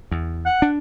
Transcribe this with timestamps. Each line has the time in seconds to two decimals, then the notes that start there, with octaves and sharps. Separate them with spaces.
0.11 E2
0.46 F#5
0.62 D4